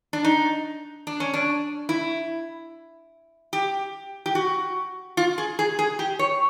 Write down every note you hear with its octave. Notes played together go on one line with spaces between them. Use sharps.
D4
D#4
D4
C#4
D4
E4
G4
G4
F#4
F4
G#4
G#4
G#4
G4
C#5